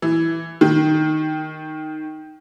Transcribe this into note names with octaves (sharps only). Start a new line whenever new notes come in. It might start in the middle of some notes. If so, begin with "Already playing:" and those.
E3
D#3